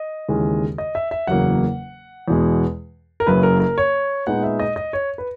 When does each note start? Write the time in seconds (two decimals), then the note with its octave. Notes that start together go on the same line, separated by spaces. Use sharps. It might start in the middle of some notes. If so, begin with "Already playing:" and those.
Already playing: D#5
0.29 D#2 C#3 E3 G#3 C#4
0.78 D#5
0.95 E5
1.11 E5
1.27 F#1 E2 C#3 F#3 A#3 F#5
2.28 E2 B2 G#3
3.20 A#4
3.27 F#1 F#2 C#3 B4
3.43 A#4
3.60 A#4
3.78 C#5
4.27 A#2 G#3 B3 D#4 F#5
4.43 E5
4.60 D#5
4.76 D#5
4.93 C#5
5.18 B4